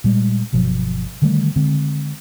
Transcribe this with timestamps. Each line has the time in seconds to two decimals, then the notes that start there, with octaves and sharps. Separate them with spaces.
0.04 A#2 G3 G#3
0.52 G1 B2 F3 F#3
1.22 D3 D#3 G3 A3
1.56 D3 G#3 C4